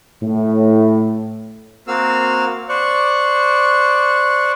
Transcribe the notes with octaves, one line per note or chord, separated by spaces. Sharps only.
A2
A#3 C4 F#4 F5 E6 F6
C5 D5 C#6 F#6